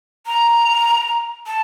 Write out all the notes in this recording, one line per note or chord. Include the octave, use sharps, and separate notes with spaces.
A#5
A5